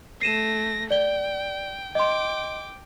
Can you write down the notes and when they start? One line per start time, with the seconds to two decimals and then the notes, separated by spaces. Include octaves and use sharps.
0.21 A3 A#6 C7 D#7 E7
0.91 D5 G5 G7
1.95 D#5 G5 C6 D6